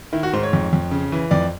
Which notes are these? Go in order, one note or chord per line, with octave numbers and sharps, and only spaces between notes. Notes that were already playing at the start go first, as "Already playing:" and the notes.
D#3 E4
F#4
G#2 C5
C#5
F2
F2
C#3
E3
F2 D5